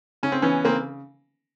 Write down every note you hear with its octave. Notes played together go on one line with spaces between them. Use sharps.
C#3 C#4
C4
E3 B3 C#4
C#3 A#3 C4